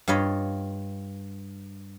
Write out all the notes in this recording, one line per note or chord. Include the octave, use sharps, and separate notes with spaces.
G2 F4 C#5 D#5 B5